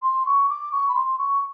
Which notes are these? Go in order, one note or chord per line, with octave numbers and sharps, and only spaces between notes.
C6
C#6
D6
C#6
B5
C6
C#6